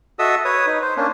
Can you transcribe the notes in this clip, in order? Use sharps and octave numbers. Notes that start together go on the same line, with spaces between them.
F#4 A4 D#5 E5 D#6 E6
B4 C#5 D#6
D#4
C5
A#3 C#4 D4